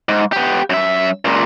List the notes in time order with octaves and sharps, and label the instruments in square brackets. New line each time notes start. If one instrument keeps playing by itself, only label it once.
[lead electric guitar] G#2
B3 G4
F#2 E5
C#2 A#2